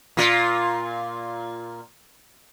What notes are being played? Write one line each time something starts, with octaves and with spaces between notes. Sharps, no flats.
A#2 F4